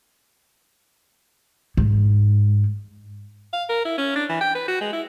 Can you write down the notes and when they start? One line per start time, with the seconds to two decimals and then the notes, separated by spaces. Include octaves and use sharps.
1.77 G#2
3.53 F5
3.69 A#4
3.85 E4
3.98 C#4
4.16 D4
4.30 E3
4.41 G5
4.55 B4
4.68 F#4
4.81 G#3
4.93 E4